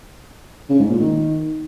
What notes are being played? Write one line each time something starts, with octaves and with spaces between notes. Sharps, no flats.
C#3
G#2
A#2
D#3